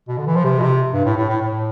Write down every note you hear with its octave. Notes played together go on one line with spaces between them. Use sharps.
B2
D3
E3
F3
C3
B2
C3
G2
A2
A2
A2
A2